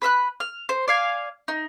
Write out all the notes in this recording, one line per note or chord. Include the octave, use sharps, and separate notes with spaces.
B4 B5 E6 F#6
F6
C5
D5 F5 G#5
D#4